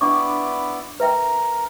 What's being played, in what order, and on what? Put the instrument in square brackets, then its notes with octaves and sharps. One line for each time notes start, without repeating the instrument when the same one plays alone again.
[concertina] B3 E4 D5 [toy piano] D4 C#6 D6
[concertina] A#4 [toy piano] B4 E5 G5